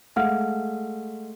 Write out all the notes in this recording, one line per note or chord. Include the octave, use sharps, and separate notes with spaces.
G#3 A3 F5 F#5 F6